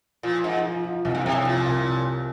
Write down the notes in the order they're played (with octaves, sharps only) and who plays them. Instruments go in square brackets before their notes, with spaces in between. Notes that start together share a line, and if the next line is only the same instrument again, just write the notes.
[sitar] A#2 [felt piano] F3
[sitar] G#2 [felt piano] F3
[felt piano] F3
F3
[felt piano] C2 [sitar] G#2
[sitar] A#2
[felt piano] C2 [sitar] C3
[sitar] C#3
[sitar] A#2 [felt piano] F3
[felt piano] C2